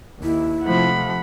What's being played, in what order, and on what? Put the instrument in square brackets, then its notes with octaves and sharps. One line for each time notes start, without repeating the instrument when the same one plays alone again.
[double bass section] D#2 [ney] E4
[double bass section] C3 F3 A3 [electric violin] F#5 B5